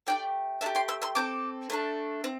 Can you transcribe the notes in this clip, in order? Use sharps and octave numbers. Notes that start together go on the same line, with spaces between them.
A3 D4 G4 D5 G5
A3 D4 E5 A5
G4
G5 C6
C6 E6
C6 E6
C4 A4 D6 G6
A3 D4 A4
C4